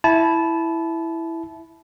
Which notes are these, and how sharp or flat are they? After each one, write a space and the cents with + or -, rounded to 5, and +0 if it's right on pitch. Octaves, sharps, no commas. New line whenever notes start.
E4 +0 A5 -25